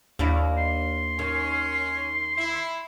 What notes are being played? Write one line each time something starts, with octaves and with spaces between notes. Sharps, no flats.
D#2 A#3 D4 E4
C6
D#3 C#4
E4